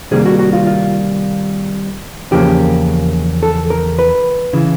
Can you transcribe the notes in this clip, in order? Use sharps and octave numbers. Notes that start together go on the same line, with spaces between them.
C3 D#3 G3 A#3 G#4
F#4
F#4
F4
F4
E2 C#3 F3 A#3 G4
A4
A#4
B4
C#3 E3